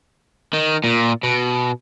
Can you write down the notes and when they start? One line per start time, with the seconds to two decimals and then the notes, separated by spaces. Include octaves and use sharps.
0.53 D#3
0.84 A#2
1.23 B2